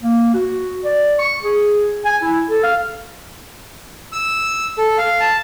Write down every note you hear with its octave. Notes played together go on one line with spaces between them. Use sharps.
A#3
F#4
D5
C#6
G#4
G#5
E4
A4
F5
E6
A4
F5
A5